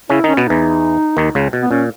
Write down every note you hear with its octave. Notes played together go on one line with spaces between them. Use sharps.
C#3 C#4 E4
D#3 C#4 D#4
B2 B3
E2 E3 D#4
D#2 D#3
C#2 C#3
B2
B3
A#2 C#4